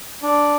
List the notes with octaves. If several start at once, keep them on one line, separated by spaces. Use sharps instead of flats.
D4